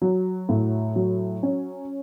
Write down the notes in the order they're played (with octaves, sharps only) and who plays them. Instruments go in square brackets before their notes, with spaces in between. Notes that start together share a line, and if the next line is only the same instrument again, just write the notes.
[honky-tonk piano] F#3
A2
F#3
C#4